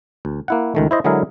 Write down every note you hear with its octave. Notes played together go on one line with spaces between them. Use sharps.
D2
A#3 E4 F#5
C#2 D#3 A3
E4 C5 D#5
D3 F#3 G#3 E4 G#4 A#4